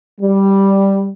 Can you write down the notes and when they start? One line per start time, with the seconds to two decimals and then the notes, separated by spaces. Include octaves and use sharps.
0.21 G3